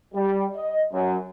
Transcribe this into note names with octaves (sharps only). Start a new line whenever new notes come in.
G3
D#5
F#2